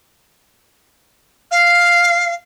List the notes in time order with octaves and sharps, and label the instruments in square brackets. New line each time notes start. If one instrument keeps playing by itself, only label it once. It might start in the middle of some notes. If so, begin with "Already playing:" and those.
[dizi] F5